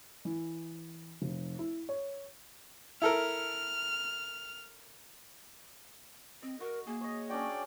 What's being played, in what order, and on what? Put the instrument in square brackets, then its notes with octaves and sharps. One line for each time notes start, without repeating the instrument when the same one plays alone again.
[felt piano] E3
F1
E4
C#5
[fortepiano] E4 A4 A#4 [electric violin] F6
[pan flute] C4 [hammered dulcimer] D#5
[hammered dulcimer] F#4 [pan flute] A#4
[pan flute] A#3 [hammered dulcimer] G#4
[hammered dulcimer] C#5 D#5
[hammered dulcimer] C#4 D4 F#4 [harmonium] D5 G5